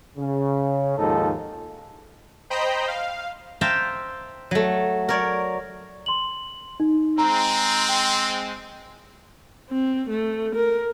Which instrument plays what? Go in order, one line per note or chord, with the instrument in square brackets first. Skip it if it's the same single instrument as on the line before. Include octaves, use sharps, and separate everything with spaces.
[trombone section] C#3
D#2 G#2 F3 D#4 A4
[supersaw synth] C5 D#5 G5 A#5 B5 G6
F5
[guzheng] C5 E5 F5 G5 A5 A#5
F#3 A3
A#4 C#5 D5
[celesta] C6 F#7
D#4
[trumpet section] G#3 C4 [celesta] A#5
[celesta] G5
[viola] C4
A3
A#4